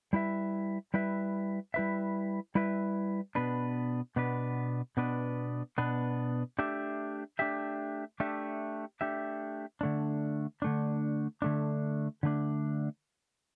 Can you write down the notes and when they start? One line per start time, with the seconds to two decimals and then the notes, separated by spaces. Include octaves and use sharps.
0.13 G3 E4 B4 E5
0.94 G3 E4 B4 E5
1.74 G3 E4 B4 E5
2.55 G3 E4 B4 E5
3.35 B2 B3 D4 B4
4.16 B2 B3 D4 B4
4.97 B2 B3 D4 B4
5.78 B2 B3 D4 B4
6.59 A3 D4 G4 E5
7.39 A3 D4 G4 E5
8.20 A3 D4 G4 E5
9.01 A3 D4 G4 E5
9.81 D3 A3 D4
10.62 D3 A3 D4
11.42 D3 A3 D4
12.23 D3 A3 D4